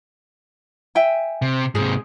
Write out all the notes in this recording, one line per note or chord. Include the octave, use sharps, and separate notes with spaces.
E5 G5 G#5
C3
G#2 C3 G#4